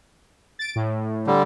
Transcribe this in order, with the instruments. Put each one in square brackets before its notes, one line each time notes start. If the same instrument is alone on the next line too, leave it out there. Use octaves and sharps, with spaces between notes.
[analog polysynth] A6 D7
A2
[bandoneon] D3 G3